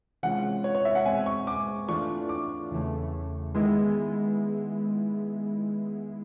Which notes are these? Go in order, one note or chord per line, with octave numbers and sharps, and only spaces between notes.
C3 E3 G#3 C#4 F4 F#5
C#5
C#5
E5
F#5
B2 G#3 C4 G#5
C#6
D6
E3 A3 D4 F4 C#6
D6
E2 C#3 E3 A3
D#3 G#3 B3 E4